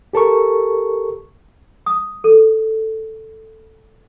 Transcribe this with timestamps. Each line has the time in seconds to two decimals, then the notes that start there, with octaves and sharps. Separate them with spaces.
0.13 G4 A4 A#4 C#6
1.86 D#6
2.24 A4